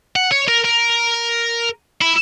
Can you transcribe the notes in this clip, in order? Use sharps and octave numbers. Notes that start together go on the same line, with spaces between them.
F#5
C#5
A#4
A#4
E4